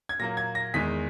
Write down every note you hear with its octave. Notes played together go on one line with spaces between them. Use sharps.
G#6
A#2 F#3 A#3 A#6
G#6
A#6
E2 D#3 G#3 B6